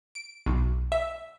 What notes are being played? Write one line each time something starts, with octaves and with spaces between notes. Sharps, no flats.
D7
B1
E5